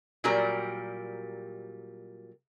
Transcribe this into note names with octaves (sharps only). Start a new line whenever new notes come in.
A#2 F#3 G3 G4 A#4 A#5